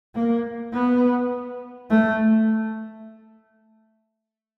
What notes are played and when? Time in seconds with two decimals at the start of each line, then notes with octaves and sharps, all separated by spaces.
0.15 A#3
0.73 B3
1.90 A3